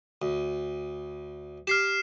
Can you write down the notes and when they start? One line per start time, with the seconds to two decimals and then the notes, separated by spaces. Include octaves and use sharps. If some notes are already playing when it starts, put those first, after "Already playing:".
0.22 D2
1.67 G4 F6 C7 E7